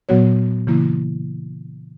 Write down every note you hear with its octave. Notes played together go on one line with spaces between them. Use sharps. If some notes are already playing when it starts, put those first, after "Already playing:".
A#2 F#3 B3 F#4 C#5
C#3 E3 A#3 E4